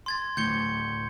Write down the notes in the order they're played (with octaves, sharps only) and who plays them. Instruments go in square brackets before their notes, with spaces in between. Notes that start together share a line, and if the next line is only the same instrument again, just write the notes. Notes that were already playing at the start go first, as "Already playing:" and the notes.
[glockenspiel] C6 G#6 A6
[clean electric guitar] D2 A2 [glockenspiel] G6 C#7 G7